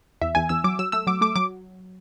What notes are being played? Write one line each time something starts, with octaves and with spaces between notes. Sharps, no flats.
E2 E5
E2 G#5
E2 E6
F#3 D6
F#3 E6
A3 E6
F#3 D6
A3 D6
F#3 D6